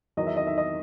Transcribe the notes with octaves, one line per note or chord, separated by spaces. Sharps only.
E2 D#3 F#3 D#5
E5
D#5
E5
D#5